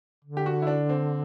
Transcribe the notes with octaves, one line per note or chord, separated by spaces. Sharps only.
D3
G4
F#4
E4
D4
C4